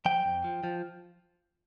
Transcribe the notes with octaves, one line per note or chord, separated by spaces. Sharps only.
F3 G5
F2
F3
F3